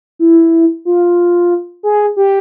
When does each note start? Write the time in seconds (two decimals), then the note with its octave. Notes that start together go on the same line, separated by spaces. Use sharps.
0.19 E4
0.85 F4
1.83 G#4
2.17 G4